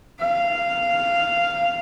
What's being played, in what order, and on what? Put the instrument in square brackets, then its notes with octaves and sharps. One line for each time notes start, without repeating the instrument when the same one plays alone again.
[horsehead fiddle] F5